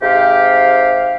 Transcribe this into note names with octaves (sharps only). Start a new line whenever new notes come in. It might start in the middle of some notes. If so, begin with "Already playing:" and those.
G#2 C3 G4 F5